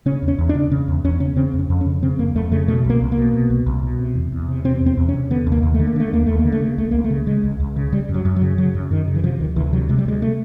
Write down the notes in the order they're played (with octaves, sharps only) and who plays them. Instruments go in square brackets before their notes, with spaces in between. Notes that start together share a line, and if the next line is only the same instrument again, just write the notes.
[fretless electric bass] C#3 C#4
E2
C#4
E2
D4
C#3
C#3 C#4
E2
E2 C#4
C#3 C#4
C#3 C4
F2
C#4
F2
C#4
C#3
C#3 C4
F2 A#3
F2 A3
C#3 A3
B2 A3
C2
A#3
C2
A#3
B2
B2
C2
C2
B2
C3
E2
E2
C3
C3 C4
E2
C4
E2
C#4
C3
D3 B3
D#2
A#3
D#2
A3
D3
A#3
D3 A3
D#2 A#3
D#2 A3
A#3
D3
A3
C#3 A#3
C#2 A3
C#2 A#3
A3
C#3
C#3 G#3
C#2
C#2
C#3
C#3 G3
F#2
F#3
F#2
F#3
C#3
C#3 F#3
F#2
F#2 D#3
C#3
E3
C3 F3
D2 D#3
D2 E3
C3 F#3
C3 G#3
G3
D2 G#3
A3